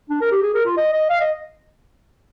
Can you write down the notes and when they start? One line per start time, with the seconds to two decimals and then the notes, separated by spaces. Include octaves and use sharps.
0.10 D4
0.21 A#4
0.31 G4
0.42 G#4
0.54 A#4
0.65 F4
0.77 D#5
0.93 D#5
1.10 F5
1.21 D#5